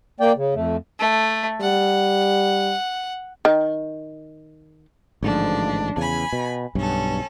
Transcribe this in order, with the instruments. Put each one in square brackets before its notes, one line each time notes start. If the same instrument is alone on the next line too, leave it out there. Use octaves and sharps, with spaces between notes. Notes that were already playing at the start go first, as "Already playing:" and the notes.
[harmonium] A#3 D5 G5
C#3
F2 A3
[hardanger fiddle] A3
[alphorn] G3 [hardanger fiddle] F#5
[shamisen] D#3
[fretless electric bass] A1 G#2 D3 [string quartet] F3 D4
[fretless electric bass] E2 C#3 [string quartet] G#5 B5
[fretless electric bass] B2
[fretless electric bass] B1 G2 [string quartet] C#4 A4